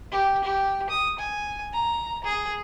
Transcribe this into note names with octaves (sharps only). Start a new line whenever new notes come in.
G4
G4
D#6
G#5
A#5
G#4